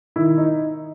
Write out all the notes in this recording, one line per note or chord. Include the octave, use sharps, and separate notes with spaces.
D#3 E4
D#4